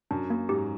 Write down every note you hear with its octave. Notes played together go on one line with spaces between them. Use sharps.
F#2 D4
A#3
G#2 G4